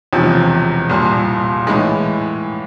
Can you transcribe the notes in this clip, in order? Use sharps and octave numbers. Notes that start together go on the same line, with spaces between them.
E1 E2 C3 F3
C2 A#2 G3
A2 E3 G#3